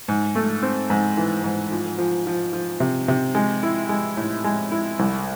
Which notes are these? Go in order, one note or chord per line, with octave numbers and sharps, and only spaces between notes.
G#2
A3
C4
G#2
E3
G#2
F3
F3
F3
F3
C3
C3
G#3
E4
G#3
A2
G#3
E4
C2